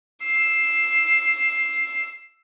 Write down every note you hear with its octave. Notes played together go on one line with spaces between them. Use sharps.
E6 C7